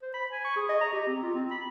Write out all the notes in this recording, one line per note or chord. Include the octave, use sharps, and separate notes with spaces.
C5
B5
G#5
C#6
G#4
D#5
A#5
G4
C4
F4
C4
B5